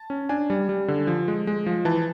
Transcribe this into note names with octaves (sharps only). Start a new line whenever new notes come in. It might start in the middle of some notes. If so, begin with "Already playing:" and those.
Already playing: A5
C#4
D4 G#5
G3
G3
D3
F3
G#3
G#3
F3
E3 A5